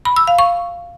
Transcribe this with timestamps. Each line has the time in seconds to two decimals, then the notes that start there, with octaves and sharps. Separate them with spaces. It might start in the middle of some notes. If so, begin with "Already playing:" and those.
0.05 B5
0.16 E6
0.27 F5
0.39 C#6